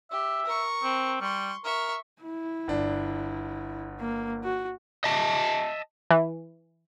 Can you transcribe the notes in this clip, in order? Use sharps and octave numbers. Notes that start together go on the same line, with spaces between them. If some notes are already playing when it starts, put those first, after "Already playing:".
G4 E5
A#4 C#6
C4
G3 C6 C#6
A#4 E5 C#6
E4
G1 D4
A#3
F#4
D#5 E5 A5
E3